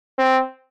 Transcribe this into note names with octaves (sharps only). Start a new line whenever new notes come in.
C4